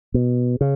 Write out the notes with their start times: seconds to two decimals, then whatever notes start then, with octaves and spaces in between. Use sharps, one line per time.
0.14 B2
0.61 C#3